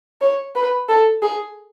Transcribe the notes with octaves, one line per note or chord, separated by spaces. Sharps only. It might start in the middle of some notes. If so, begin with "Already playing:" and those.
C#5
B4
A4
G#4